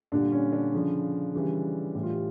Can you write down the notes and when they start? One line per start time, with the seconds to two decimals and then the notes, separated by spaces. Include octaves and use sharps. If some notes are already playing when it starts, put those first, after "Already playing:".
0.12 A#2 D3 G3 D4
0.32 C#4
0.52 D3 D4
0.73 C#3 F3
1.34 C#3 E3 G3
1.94 A2 E3 G3
2.03 F4
2.10 G3 G4